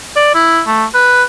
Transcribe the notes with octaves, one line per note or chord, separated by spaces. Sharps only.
D5
E4
A3
B4